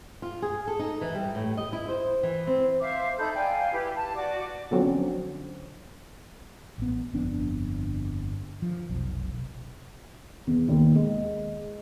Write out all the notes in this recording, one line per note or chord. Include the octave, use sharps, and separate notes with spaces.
F4
G#4
A4
D#4
E3
G3
A2
D#5
E4
C5
E3
C4
C5 E5 F5 D6
D#4 A4 B5 G6
D5 F5 G5 G#5
E4 G4 B4
A5
F#4 D5 D6
B2 D3 F3 F#3 C4 C#4
A1 B3
G1 F2 B3 D4
F3
F1 B1
E2
D#2
G#3